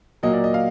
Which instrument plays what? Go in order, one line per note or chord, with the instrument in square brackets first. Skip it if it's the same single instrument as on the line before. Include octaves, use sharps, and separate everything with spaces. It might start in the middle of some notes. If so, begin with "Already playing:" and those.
[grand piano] A#2 F#3 A#3 D#5
D5
D#5
F5